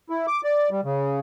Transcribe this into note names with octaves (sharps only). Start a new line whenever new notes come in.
E4
D6
D5
G3
C#3